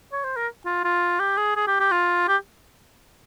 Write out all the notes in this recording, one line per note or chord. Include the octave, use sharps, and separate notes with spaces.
C#5
C5
A#4
F4
F4
G4
G#4
G#4
G4
G4
F4
G4